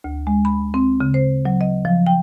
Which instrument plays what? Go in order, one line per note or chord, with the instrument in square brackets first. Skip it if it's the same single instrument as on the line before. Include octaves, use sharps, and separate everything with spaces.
[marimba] D2
G#3
B5
C4
C#3
C5
F#3
D#5
F3
G5